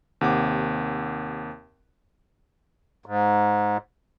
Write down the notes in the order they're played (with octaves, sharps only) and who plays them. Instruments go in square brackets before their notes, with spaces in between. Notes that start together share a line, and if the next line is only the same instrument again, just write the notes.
[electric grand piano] D#2 C3 F#5 D6
[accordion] G#2